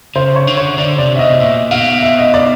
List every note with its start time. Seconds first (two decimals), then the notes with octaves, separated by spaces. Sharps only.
0.15 C#3 C5
0.36 C#5
0.47 D3
0.57 C#5
0.78 D3 D5
0.98 C3 D5
1.15 E5
1.19 B2 D#5
1.40 A#2 E5
1.71 B2 F5
2.03 E5
2.19 D#5
2.34 D5